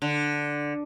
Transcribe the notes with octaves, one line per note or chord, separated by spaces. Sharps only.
D3